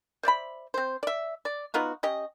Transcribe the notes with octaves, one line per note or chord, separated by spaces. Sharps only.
C5 D5 E5 B5
C4 C5
D5 E5
D5
B3 D#4 F4 F#4
C#4 G4 D#5